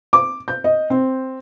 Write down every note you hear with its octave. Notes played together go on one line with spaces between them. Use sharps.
D6
G6
D#5
C4